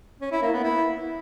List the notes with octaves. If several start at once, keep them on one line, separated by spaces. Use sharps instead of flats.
C#4
E4
A#3
B3
E4